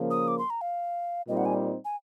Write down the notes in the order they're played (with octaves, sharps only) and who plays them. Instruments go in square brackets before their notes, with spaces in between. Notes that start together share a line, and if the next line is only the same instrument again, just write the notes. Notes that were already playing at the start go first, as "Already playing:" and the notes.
Already playing: [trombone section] C#3 F3 A#3
[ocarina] D#6
D6
C6
A#5
F5
[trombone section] A#2 G3 C4 D#4 [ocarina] D#5
[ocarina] F#5
G#5
G#5